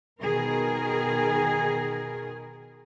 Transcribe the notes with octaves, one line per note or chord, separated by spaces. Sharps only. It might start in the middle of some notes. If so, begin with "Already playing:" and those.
B2 D#3 G#4 A#4